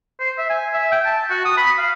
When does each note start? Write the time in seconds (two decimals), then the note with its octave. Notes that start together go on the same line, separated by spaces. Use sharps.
0.20 C5
0.38 E5
0.50 G#5
0.74 E5
0.92 G5
1.05 A5
1.30 F#4
1.45 D#6
1.57 B5
1.78 F5